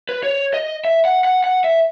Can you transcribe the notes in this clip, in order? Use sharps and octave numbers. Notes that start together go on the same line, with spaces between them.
B4
C#5
D#5
E5
F#5
F#5
F#5
E5